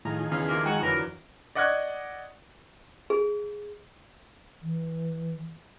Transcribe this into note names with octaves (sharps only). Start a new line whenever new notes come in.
A2 D#3 F3 G#4 A#5
E2 C#3 F5 G#5
C3 A#3
G#3 F#4 G5 G#5 A#5
F2 D3 E3 F#3 A#4 B4
D5 D#5 F#5 C#6 F#6 G#6
G#4
E3